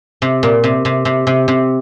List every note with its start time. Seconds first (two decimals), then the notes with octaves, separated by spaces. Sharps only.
0.22 C3
0.43 A#2
0.64 C3
0.85 C3
1.05 C3
1.27 C3
1.48 C3